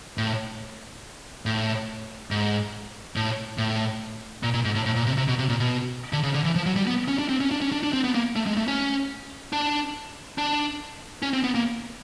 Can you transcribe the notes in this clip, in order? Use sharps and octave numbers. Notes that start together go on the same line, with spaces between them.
A2
A2
G#2
A2
A2
A#2
A#2
G#2
A2
A2
A#2
C3
C3
B2
C3
A#2
B2
D3
C#3
D3
E3
F3
F#3
G3
B3
C#4
D4
C4
C#4
D4
C#4
D4
D4
C4
B3
A#3
A3
G#3
A3
C#4
D4
D4
C#4
C4
B3
A#3